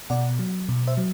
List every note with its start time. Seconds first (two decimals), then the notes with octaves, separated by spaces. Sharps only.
0.10 B2 D5 F#5
0.39 F#3
0.69 B2
0.87 C5 E5
0.97 F#3